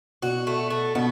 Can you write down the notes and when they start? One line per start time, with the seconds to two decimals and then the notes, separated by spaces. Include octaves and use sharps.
0.22 B2 F#4
0.47 A3
0.70 A3
0.95 B2 B3